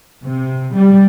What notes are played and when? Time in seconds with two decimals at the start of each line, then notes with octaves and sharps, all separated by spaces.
0.25 C3
0.76 G3